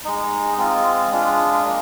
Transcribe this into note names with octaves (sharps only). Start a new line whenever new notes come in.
G#3 D#4
G#3 C4 F4
G#3 D4 F4
A#3 D4